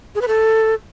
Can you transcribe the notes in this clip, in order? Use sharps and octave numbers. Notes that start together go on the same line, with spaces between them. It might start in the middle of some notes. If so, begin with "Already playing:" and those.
G#4
B4
A4